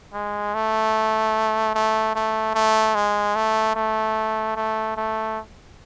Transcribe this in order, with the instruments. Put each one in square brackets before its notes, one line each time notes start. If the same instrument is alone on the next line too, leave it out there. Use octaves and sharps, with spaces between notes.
[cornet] G#3
A3
A3
A3
A3
G#3
A3
A3
A3
A3